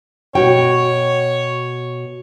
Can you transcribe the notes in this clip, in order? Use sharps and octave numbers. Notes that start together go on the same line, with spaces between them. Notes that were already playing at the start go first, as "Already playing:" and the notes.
B2 F#4 C#5 G5